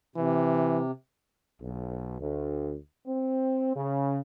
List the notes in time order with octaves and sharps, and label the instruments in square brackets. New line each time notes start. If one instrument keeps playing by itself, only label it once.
[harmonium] C3 [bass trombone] E3
[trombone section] B1
D2
C4
C#3